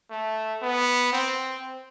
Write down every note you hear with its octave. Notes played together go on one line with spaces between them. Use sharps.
A3
B3
C4